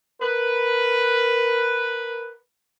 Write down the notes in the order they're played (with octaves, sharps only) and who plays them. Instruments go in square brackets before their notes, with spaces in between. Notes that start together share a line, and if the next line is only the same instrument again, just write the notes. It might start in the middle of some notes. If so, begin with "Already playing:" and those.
[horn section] A#4 B4